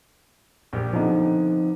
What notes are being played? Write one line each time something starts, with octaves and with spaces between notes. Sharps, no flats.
A#1 G4
B2 D3 F3 C4 D#4